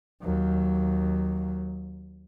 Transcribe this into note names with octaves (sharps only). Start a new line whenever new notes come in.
D#2 F#3